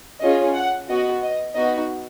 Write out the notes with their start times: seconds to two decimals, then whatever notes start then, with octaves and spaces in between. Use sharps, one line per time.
0.21 C#4 F4 G#4 D#5
0.55 F#5
0.89 B3 F#4 D#5
1.22 D#5
1.55 B3 D#4 F#4 D#5